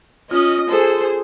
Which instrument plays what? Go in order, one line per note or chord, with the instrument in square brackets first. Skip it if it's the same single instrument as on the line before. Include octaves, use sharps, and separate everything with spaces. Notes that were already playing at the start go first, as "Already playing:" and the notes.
[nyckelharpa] C#4 [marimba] F4 [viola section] D#5
[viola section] G#4 C5 [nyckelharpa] A4